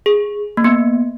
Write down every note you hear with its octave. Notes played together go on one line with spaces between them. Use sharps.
G#4
A#3
B3